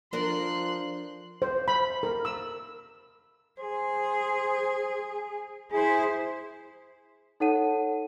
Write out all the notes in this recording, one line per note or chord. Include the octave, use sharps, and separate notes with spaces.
F3 D4 A#4 C6 F#6
C5
B5
A#4
E6
G#4 C5
E4 G#4 C5
D#4 A4 C#5 F#5 A5 D#7